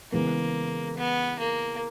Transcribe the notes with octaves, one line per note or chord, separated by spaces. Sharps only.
C#3 E3 G#3 A#3 B3
B3
A#3